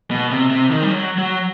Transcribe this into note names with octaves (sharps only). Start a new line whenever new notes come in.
B2
C3
C3
D#3
G3
F#3
F#3